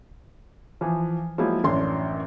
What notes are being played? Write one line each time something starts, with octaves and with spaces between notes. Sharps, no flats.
E3 F3
F3 F#3 G#3 A#3 E4
A1 F#2 C#4 D4 C6